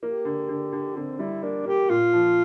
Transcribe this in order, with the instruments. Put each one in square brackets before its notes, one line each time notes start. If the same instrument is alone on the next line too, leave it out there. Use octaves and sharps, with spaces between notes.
[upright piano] A#3 [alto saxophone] G4
[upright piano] D3
D3
D3
[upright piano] D3 [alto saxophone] C4
[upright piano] G3 [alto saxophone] E4
[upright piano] A#3 [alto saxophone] D4
[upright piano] A#3 [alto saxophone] G4
[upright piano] A#2 [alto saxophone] F4
[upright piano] F3